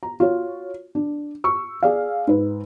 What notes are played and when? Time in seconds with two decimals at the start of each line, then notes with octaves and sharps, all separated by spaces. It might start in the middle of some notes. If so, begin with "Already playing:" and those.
0.03 A#5
0.20 F4 F#4 C#5
0.95 D4
1.44 C#6 E6
1.83 G#4 D5 F5
2.27 G#2 B4